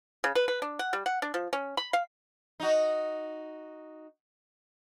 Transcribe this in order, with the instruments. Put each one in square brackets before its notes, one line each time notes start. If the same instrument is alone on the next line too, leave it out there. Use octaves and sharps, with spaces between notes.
[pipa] C#3
B4
B4
D4
F#5
G3
F#5
D4
F3
C#4
B5
F5
[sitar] D#4 F#4